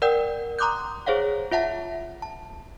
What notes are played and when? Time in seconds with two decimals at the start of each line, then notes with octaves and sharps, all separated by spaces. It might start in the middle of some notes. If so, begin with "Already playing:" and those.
0.02 A#4 D5 F#5 G5 E6 G6
0.59 A#5 C6 D6 D#6 F#6 G6
1.06 G#4 C5 C#5 F5 F#5
1.51 F4 E5 F#5 A5
2.22 A5